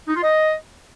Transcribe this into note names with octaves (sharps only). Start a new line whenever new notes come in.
D#4
F4
D#5